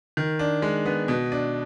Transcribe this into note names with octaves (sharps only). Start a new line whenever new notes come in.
D#3
D4
G#3
B3
B2
D4